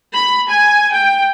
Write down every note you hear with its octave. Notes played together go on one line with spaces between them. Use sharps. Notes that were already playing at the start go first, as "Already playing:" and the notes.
B5
G#5
G5